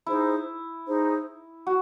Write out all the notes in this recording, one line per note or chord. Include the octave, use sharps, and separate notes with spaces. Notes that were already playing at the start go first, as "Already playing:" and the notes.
D#4 E4 G#4 C5
D#4 G#4 C5
F#4